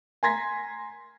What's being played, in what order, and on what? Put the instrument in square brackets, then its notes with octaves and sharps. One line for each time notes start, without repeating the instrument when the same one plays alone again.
[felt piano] G#5 A#5 C6 G#6 A#6 B6